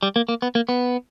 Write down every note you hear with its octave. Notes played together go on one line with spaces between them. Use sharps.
G3
A#3
A#3
B3
A#3
B3